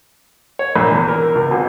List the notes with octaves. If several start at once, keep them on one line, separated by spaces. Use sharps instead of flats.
C#5
A#1
E2
A#4
C#2
G#1